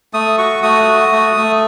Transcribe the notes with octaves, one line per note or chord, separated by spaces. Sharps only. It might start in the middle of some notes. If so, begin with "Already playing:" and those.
A3 D#6
F#4 C#6
A3 D#6
F#4
A3
A3